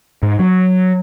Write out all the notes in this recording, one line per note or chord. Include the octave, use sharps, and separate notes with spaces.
G#2
F#3